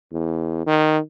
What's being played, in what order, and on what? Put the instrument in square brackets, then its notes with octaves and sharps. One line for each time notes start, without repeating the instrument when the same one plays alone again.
[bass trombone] E2
D#3